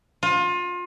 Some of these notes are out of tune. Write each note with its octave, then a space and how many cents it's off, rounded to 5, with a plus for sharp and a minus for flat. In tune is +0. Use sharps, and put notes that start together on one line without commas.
F4 +30